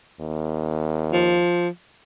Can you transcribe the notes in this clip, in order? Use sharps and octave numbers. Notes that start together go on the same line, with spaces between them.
D#2
F3